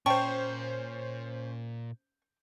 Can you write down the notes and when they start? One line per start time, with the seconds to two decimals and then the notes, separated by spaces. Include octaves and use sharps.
0.06 A#2 C#4 C5 D5 G5 A5 C#6